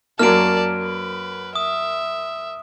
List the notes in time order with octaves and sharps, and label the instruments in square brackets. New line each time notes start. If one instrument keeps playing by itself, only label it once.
[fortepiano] F#2 F#3 A#3 [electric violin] D5 A5 [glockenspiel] F6 D7
[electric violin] B4
[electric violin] E5 [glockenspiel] D#6